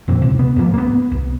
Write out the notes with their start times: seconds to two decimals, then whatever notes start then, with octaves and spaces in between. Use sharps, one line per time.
0.08 F2 A#2 C4
0.22 C#2 C3
0.39 B3
0.56 D2 G#2 F3 A#3
0.74 A#3 B3
1.12 C2